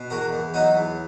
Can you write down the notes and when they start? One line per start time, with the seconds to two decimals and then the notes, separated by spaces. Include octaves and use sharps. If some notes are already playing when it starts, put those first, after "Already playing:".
Already playing: B2
0.10 E2 F#4 A#4
0.33 E2
0.54 F#3 D#4 F#4
0.76 E2